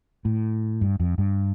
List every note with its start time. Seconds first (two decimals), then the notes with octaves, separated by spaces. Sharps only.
0.25 A2
0.81 G2
1.00 F2
1.18 G2